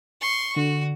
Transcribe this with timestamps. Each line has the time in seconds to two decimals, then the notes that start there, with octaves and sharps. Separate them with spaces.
0.21 C6 C#6
0.56 D3 F#4